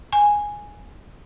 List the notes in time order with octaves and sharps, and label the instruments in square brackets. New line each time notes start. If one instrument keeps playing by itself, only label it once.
[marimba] G#5